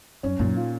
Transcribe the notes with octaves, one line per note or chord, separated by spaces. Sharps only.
F#2 C#4
F#2 A#2
F4